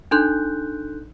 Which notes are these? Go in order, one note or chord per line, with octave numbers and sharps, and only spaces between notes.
D4 D#4 A4 C6 F#6 G6